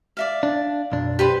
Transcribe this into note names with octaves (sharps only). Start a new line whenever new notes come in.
D5 E5 F5
D4
B1 F#2 D4
G4 B4 C5